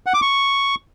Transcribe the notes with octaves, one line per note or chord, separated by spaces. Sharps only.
F#5
D6
C#6